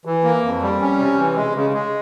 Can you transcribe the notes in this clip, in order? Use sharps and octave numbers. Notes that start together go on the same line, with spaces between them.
E3
A#3
F2
G3
C#4
C3
E3
G#3
C#3
G#3